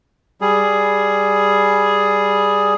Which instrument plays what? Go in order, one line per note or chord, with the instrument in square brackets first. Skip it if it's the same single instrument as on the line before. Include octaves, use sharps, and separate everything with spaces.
[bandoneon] G3 G#4